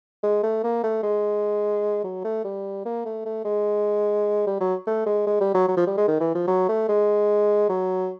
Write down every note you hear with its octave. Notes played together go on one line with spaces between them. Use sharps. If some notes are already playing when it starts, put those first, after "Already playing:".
G#3
A3
A#3
A3
G#3
F#3
A3
G3
A#3
A3
A3
G#3
G3
F#3
A3
G#3
G#3
G3
F#3
F#3
F3
G3
G#3
D#3
E3
F3
F#3
A3
G#3
F#3